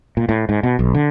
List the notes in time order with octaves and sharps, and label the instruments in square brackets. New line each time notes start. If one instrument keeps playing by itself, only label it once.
[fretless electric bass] A#2
A2
G#2
B2
B1
D3